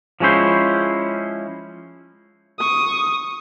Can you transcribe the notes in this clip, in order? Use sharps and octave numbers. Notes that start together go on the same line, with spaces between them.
F3 G#3 C#4 E4 C5
C#6 D#6